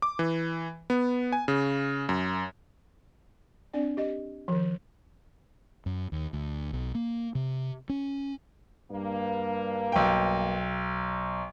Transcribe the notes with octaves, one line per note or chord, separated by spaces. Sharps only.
D6
E3
B3
G#5
C#3
F#2
C4 D4 D5
G4 D#5
D#3 F3
F#2
D#2
D2
B1
A#3
C3
C#4
G2 A#3
B1 G5